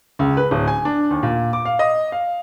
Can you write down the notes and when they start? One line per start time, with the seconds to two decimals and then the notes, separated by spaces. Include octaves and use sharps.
0.19 C#2
0.37 B4
0.51 D1
0.68 G#5
0.85 D4
1.11 D#2
1.23 A#2
1.53 D6
1.65 F5
1.79 D#5
2.12 F5